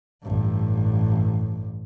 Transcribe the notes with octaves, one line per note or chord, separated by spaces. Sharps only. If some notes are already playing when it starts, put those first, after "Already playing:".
A1 G2